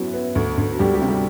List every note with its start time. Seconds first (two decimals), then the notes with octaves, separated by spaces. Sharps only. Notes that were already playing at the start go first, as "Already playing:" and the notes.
Already playing: F#2 F#3 B3 E4 F#4
0.13 B3
0.35 D2
0.58 D2
0.72 F#4
0.79 D2 G3 G4
0.94 G3 G4
1.02 C3
1.08 G3 G4